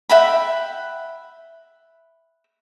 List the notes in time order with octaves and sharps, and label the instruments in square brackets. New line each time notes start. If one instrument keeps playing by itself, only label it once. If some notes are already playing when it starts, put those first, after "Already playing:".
[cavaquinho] E5 F#5 G5 B5